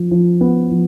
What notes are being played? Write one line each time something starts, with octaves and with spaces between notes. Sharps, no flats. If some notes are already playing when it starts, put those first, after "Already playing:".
Already playing: F3
F3
B3
F3